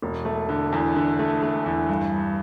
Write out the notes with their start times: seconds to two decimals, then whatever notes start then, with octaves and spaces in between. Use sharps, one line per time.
0.02 E1
0.25 A3
0.49 D3
0.72 E2
0.96 D3
1.19 A3
1.42 A3
1.66 E2
1.89 G2
2.13 G2